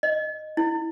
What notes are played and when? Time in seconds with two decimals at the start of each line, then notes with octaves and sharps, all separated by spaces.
0.03 D#5
0.57 E4